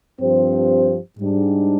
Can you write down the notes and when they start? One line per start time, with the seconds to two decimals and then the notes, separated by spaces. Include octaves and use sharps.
0.20 G2 F3 C4 G4 C5
1.17 G#2 G3 D4